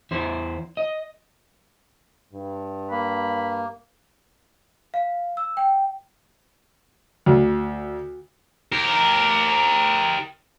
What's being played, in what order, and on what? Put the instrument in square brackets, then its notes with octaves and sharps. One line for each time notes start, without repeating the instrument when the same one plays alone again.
[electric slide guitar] E2 E4 C5
D#5
[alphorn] G2
[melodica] A#3 [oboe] B5
[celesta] F5
E6
G5
[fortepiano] D2
[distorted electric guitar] G4 A#4